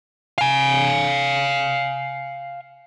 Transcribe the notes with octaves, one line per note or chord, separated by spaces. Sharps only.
F5 G#5